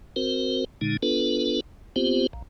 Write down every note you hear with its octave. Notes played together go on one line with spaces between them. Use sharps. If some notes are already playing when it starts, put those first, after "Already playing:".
C4 F#4 A#4 C5
A#2 D3 G#3 D#4
B3 D4 F4 A4 B4
B3 C4 F4 G4 C5
A#1